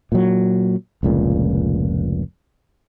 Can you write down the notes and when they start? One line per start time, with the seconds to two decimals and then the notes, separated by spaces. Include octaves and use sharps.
0.12 A#2 F#3
1.03 F1 C#2 A#2